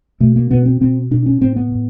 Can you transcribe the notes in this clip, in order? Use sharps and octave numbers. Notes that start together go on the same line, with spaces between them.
B2 A3
A#3
B2 B3
C4
B2 C4
B2 D4
C#4
A2 C4
B3
A2